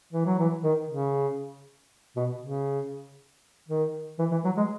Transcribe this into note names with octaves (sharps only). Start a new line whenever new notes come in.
E3
F#3
E3
D#3
C#3
B2
C#3
D#3
E3
E3
F#3
G#3